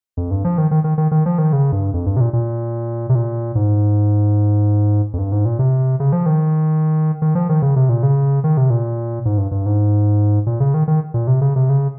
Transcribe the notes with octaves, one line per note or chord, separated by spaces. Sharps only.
F2
G2
F3
D#3
D#3
D#3
D#3
D#3
F3
D#3
C#3
G2
F2
G2
C3
A#2
A#2
C3
A#2
G#2
F2
G2
G#2
A#2
C3
C#3
F3
D#3
D#3
F3
D#3
C#3
C3
A#2
C#3
D#3
C3
A#2
G#2
G2
G2
G#2
A#2
C#3
D#3
D#3
A#2
C3
C#3
C3
C#3